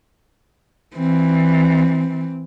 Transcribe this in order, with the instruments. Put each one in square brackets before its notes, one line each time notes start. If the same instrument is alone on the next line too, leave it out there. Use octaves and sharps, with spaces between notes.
[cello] E3 [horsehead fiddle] C4